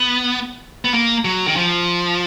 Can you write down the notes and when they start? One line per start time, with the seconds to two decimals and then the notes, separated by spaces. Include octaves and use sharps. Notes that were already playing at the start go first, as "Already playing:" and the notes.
Already playing: B3
0.85 B3
0.94 A#3
1.25 F#3
1.47 D#3
1.56 F3